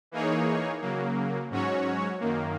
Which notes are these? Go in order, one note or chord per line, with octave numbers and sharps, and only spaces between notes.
E3 A#3 D#4 G#4 C#5
C#3 F#3 A#3
G#2 F#3 C#4 F#4 C#5
F#2 D#3 A#3